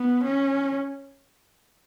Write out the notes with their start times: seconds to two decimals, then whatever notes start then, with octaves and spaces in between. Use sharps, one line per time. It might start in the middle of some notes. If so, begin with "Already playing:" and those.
Already playing: B3
0.24 C#4